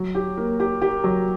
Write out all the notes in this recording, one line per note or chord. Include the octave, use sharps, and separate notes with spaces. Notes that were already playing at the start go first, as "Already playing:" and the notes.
Already playing: F#3
G4
A#3
G4
G4
F#3